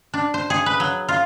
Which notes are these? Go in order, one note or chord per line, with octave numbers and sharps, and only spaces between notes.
D4
C5
G#4
B4
F#3
F4